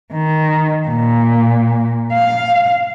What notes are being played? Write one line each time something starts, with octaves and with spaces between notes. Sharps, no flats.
D#3
A#2
F5